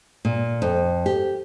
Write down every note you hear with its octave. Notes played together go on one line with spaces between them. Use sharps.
A#2
F2
G4